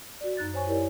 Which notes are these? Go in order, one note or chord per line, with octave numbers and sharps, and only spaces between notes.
F#4 D5
F#2 D#4 F#6 A6
C5 C#5 G#5 C#6
E4 G4 A#4 C#5 D5